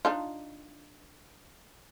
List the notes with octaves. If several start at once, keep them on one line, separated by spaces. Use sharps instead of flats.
D4 D#4 F4